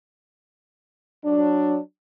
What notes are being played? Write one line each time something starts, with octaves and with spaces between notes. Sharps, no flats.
F#3 D4